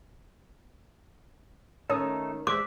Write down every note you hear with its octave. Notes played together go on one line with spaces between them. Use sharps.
D#3 A3 C#4 D#4 A4 C#5 A5 D#6
G#3 G#4 C5 D5 E5 D6 F#6